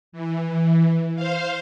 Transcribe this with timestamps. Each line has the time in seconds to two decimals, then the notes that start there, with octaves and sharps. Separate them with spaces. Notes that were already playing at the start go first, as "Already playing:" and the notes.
0.12 E3
1.16 C5 F5